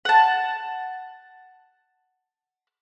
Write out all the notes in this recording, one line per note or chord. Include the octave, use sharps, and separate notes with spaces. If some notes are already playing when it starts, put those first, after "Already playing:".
F#5 A5